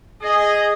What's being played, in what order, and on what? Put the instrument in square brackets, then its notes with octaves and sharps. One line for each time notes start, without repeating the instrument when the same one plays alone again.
[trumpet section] G#4 [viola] D#5